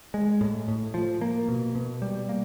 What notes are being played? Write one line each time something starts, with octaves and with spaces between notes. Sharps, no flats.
G#3
A2
A2
F3
A#3
B2
B2
G3
A#3